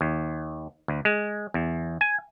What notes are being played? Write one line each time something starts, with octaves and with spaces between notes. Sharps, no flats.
D#2
D2
G#3
E2
G#5